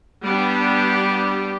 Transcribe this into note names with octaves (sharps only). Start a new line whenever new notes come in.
G3 B3 D4 G4